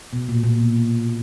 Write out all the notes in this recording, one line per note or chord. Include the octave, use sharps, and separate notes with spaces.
B2
A#2
A#2
B2